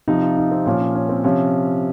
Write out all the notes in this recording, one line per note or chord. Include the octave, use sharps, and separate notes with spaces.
C3 F3 D#4
F4
D#4
C4
A#2 F3 C#4
C#4
C#4
C4
C3 F3 C#4